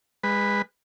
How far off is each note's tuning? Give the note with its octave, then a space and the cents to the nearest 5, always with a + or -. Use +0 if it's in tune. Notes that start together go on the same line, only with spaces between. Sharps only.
G#3 -30 B4 +0